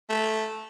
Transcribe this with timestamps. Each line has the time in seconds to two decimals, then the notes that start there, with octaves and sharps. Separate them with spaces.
0.10 A3